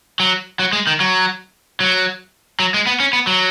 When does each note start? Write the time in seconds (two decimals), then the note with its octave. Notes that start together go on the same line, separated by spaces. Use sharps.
0.20 F#3
0.59 F#3
0.73 G#3
0.87 D#3
1.00 F#3
1.80 F#3
2.60 F#3
2.74 G#3
2.87 B3
3.00 C#4
3.13 B3
3.27 F#3